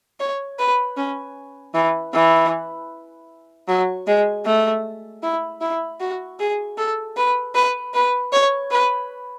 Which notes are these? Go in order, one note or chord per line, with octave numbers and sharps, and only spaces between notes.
C#5
B4
C#4
E3
E3
F#3
G#3
A3
E4
E4
F#4
G#4
A4
B4
B4
B4
C#5
B4